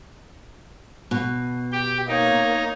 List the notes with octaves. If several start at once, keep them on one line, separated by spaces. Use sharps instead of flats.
B2
G4 G5
A#3 D#4 C#5